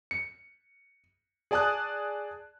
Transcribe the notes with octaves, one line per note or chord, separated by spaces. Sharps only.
C#7
G#4 D5 G#5 A5 D#6 F#6